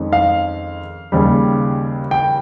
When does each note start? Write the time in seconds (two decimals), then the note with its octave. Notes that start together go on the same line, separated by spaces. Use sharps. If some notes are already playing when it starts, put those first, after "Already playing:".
Already playing: F2 D#3 G#3 C#4
0.13 F5
1.12 D#2 C#3 G3
2.11 G5